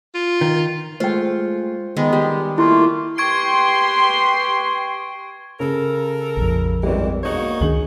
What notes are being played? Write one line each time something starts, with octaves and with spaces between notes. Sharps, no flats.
F4
D#3
G#3 A3 F4 C5 G5
D#3 G#3 B3
G3 G4
A3 A#3 E4 F4
G4 B4 G5 C6 C#6 G#6 D7
C#3 A4 A#4
A#1 F2
G#1 D#3 E3 G3
E1 D#4 F#4 C#5
A#3 F5
C#2 D#3 D4 G#4 F#7